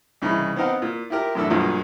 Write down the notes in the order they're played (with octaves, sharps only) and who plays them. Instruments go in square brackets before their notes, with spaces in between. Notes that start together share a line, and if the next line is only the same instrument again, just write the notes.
[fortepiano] C2 C#3 E3 D#4 B5
B3 C4 D#4 F5 F#5
A#2
E4 F4 G4 A#4
F#2 A2 E3 D4 A4 E6
B1 G2 A#2 F3 F#3 G#3